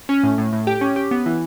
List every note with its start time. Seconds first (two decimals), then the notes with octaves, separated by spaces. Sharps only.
0.09 C#4
0.24 A2
0.38 A2
0.53 A2
0.67 G4
0.81 C#4
0.96 G4
1.11 B3
1.26 E3